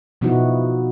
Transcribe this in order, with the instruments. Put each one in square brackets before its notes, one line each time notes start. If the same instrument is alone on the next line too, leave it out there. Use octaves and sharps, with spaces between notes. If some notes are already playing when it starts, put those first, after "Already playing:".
[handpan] B2 F3 B3 D#4 E4 F#4